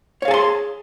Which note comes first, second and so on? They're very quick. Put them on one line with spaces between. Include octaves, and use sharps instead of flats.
C#5 F5 G#4 A5 C6